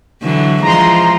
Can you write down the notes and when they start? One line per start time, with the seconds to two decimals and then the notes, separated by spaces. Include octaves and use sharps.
0.22 D3 E3 F#3
0.62 E3 F3 G#3 A#5 C6